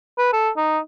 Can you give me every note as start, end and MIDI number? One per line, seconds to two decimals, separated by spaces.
0.18 0.29 71
0.33 0.49 69
0.57 0.79 63